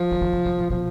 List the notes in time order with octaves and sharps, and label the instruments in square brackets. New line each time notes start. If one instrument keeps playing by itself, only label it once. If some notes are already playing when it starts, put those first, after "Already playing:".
Already playing: [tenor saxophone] F3
[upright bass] E3
D3
C3
C3
B2
[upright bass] B2 [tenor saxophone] F3